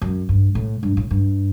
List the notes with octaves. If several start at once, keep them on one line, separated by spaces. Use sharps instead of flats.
F#2
G2
A2
G2
A2
G2